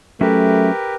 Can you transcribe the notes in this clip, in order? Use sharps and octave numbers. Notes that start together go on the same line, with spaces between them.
F#3 A3 C#4 G4 A#4 B4 E5